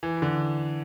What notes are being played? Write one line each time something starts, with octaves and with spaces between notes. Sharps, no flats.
E3
D3